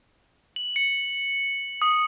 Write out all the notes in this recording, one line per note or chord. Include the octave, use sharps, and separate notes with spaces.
F#7
C#7
D#6